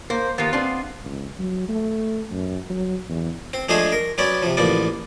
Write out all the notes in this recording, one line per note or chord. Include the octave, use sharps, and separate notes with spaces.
A#3 C5
D#2 A#3 B3 F4
C4 D4
C#2
F#3
A3
F#2
F#3
E2
C4
F3 G#3 A3 D4 G#4 C5
A#4
F#3 B3 C#4 C#5 D5
C3 F3
A1 F3 A#3 B3 D5